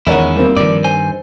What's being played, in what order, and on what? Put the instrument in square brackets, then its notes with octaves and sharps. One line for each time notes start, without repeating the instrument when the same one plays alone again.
[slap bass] E2 D#3 [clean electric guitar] G#3 C#4 E4 [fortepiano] A#4 C#5 F#5
[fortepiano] G3 A#3 C4
[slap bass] G2 D#3 [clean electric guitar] F3 D5
[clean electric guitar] C5 G#5